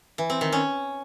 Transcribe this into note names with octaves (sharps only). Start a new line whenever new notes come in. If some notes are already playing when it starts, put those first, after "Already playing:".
E3
C4
D#3
C#4